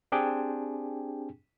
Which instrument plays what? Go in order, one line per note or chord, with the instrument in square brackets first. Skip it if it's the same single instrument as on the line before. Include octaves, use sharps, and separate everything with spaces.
[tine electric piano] C4 D4 G4 G#4 G5 G#5